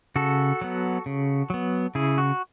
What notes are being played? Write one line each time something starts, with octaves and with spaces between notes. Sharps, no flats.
C#3 F#4 A4
F#3 B3
C#3
F#3 B3
C#3 E4 G#4
F#4